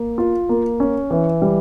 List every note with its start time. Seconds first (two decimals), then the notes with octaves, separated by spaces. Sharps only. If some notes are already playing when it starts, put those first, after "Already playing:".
Already playing: A#3
0.18 F4
0.49 A#3
0.80 C#4
1.11 E3
1.42 G3